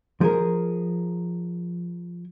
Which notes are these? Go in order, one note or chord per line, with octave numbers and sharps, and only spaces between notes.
F3 G#4 A#4